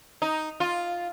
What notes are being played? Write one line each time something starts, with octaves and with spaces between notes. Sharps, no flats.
D#4
F4